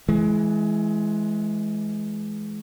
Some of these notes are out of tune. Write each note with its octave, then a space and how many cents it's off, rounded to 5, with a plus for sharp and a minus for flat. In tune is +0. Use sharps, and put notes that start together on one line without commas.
E3 +0 G#3 +25